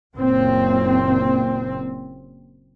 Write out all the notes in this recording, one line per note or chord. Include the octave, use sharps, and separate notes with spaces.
F#1 A#2 C4